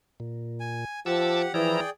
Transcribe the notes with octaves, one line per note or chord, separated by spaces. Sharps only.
A#2
G#5
F3 G4 F#5 A5 D6 E6
E3 F3 E4 G#4 D5 G5 A#5